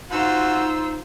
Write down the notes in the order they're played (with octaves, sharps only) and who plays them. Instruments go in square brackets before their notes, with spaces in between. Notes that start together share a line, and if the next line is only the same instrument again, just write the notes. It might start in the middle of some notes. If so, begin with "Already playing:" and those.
[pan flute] D#4 [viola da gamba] F4 [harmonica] F#4 [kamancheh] C5 E6